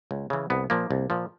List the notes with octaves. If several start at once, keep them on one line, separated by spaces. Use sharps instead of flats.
C#2
C#3 E3
C2 B3
A#2 F3 A#3
C2
A#2 F3